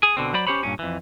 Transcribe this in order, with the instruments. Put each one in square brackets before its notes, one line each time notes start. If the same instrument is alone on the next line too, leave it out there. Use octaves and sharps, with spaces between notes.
[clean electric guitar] G#4
B2 D3 C4
F#3 C5 D5 B5
C#4 D#4 G4 C5 C#5 B5
G2 A#2 C#4
F2 E3